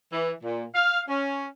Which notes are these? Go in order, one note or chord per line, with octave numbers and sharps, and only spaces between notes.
E3
A#2
F5
C#4